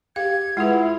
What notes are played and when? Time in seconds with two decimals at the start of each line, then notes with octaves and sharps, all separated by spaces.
0.16 G4 F5 G#6
0.57 G#3 E4 F4 G#4 B4 F#5